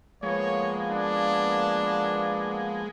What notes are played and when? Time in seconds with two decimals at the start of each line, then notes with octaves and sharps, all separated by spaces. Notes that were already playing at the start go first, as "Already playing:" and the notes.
0.23 F3 G#3 A#3 B3 C#5
0.90 D4